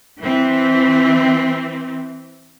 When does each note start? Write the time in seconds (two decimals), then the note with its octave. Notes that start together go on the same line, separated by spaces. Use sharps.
0.21 E3 C4